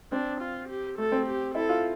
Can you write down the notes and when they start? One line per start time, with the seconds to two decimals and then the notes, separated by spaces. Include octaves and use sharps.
0.12 C4 D4
0.41 F4
0.68 G4
0.98 A3 A4
1.12 C4
1.26 G4
1.55 E4 A4
1.69 F4